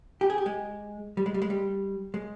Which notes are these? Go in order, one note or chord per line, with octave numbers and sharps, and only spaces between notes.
G4
G#4
G4
G#3
G3
G#3
G3
G#3
G3
G#3